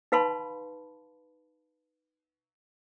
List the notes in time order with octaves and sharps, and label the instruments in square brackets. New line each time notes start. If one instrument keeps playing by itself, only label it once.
[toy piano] D#4 B4 F5 A5 B5 C6